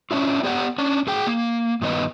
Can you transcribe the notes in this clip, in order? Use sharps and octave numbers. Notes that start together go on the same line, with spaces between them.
C#4 D4 E4 F4
B3 G4 D5 F#5
C#4 D4
A2 G#4 G5
A#3
G2 D#3 B3 D#5